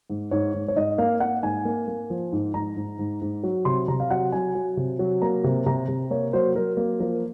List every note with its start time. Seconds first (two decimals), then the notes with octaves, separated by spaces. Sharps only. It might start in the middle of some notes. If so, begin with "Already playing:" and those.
0.10 G#2
0.31 G#2 C#5
0.54 G#2
0.68 C#5
0.76 G#2 D#5
0.98 A#3 F5
1.20 A#3 F#5
1.42 G#2 G#5
1.65 A#3
1.88 A#3
2.10 F3
2.32 G#2
2.54 G#2 A#5
2.76 G#2
2.99 G#2
3.22 G#2
3.43 F#3
3.65 C3 C6
3.88 C3 A#5
4.00 F5
4.10 F#3 F#5
4.32 F#3 G#5
4.55 F#3
4.77 C3
4.99 F#3
5.22 A#3 A#5
5.44 C3
5.66 C3 A#5
5.88 C3
6.11 A#3 C#5
6.33 F#3 C5
6.56 F#3 A#4
6.77 A#3
7.00 F3 A#4